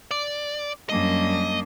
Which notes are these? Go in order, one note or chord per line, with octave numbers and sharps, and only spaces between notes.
D5
F#2 G3 A#3 D4 D#5